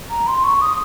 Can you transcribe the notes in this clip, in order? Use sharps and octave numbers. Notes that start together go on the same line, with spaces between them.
A#5
C6
C#6
D#6